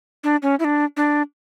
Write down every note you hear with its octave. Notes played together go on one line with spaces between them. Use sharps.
D4
C#4
E4
D4
D4